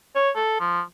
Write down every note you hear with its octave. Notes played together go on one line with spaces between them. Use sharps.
C#5
A4
F3